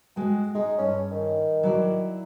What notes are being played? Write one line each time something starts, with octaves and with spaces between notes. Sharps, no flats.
G#3 F#4 G5
G#3 D#4
G2 C#4
D#3
F#3 E4 D5